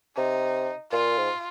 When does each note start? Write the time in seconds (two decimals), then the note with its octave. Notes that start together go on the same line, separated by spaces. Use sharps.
0.16 C3 D#4
0.92 A#2 F4
1.18 G#2